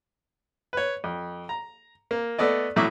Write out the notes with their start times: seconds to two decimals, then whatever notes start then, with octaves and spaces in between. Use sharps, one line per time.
0.73 B4 C#5
1.04 F2
1.49 A#5
2.11 A#3
2.38 A3 B3 A4 D5 D#5
2.76 A2 F#3 E4 E5 D6 D#6